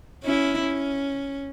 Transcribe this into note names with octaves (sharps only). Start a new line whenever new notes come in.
C#4 E4
C#4